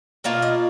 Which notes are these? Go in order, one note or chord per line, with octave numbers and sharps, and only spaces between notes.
B2 A#3 D4 F4 D5
D#5